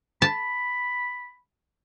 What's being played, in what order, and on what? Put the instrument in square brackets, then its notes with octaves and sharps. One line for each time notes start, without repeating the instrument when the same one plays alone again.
[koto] A5 [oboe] B5